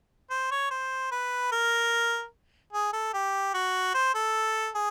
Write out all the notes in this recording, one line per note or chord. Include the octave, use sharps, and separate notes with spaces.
C5
C#5
C5
B4
A#4
G#4
A4
G4
F#4
C5
A4
G#4